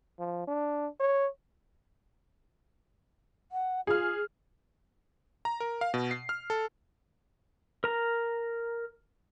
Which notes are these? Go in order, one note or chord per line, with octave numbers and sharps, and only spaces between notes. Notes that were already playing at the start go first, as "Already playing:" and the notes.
F3
D4
C#5
F#5
F4 G#4 F6
A#5
A#4
F5
B2
C7
F6
A4
A#4 A#5